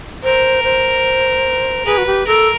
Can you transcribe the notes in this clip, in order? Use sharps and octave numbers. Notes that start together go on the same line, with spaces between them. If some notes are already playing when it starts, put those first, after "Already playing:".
A#4 C5
C5
G#4 B4
F#4
G4
A4 A#4